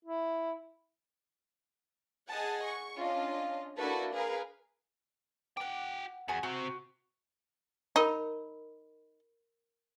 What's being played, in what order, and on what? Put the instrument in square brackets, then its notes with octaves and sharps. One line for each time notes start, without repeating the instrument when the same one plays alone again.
[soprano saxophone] E4
[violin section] G#4 D#5 F#5 G#5 A5
C#6
C#4 D4 F4 D#5
A#3 D4 E4 F#4 A4 B4
G#4 A#4 B4 F5
[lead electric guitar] F#4 G5 [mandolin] F#5 D6
[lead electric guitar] E2 [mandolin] F#4 G#4 G#5
[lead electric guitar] C3 C4 [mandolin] F#4
[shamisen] D#4 [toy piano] A#4 B5